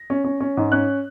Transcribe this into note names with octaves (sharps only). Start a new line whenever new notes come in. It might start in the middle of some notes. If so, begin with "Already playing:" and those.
Already playing: A#6
C#4
C#4
C#4
G#2
C#4 F#6